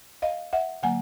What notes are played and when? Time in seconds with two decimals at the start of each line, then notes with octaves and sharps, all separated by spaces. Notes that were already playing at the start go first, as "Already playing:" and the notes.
0.22 D#5 F5
0.53 E5 F#5
0.83 D3 F#3 A#3 F#5 G#5